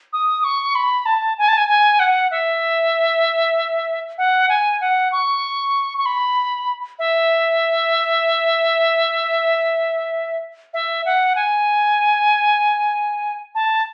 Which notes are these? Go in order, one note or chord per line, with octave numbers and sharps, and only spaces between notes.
D#6
C#6
B5
A5
G#5
A5
G#5
G#5
F#5
E5
F#5
G#5
F#5
C#6
C#6
B5
E5
E5
F#5
G#5
A5